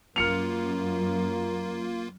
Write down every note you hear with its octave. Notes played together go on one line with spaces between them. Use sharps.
F#2 A#3 F4 A#4 F6 C#7 F7